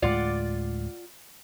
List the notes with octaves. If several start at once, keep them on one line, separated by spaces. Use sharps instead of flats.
D2 A2 G#3 F4 D5 F#5